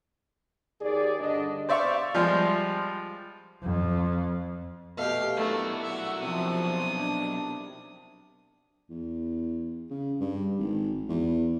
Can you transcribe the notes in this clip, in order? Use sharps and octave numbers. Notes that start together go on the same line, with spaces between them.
D#2 G#4 D5
G2 D3 D4 D#5
C5 D5 E5 F5 C#6
F3 G3 G#3 F4
F2
B2 A3 G4 F5
B1 A3 D4 E4 F#4 A#4
E5 F#5
C3 F3 D#6
D4
E2
C#3
G2
G#1
E2